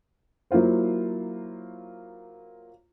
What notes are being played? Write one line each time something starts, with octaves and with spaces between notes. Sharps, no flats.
F#3 A#3 E4 F4 C5